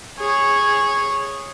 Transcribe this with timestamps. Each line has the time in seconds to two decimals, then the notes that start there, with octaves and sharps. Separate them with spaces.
0.20 G#4 C#5